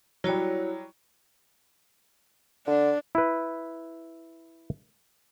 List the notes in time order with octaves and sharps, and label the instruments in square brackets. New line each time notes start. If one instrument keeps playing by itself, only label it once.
[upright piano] F#3 G3 [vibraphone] E4 F#4 C#5
[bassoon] D3 [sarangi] D4
[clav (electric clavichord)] E4 B4